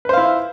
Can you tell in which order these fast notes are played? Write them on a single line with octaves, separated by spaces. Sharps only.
B4 C5 F5 E4